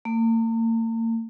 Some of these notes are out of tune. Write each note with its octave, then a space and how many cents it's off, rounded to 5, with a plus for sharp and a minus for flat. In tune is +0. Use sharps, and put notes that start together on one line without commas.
A#3 -45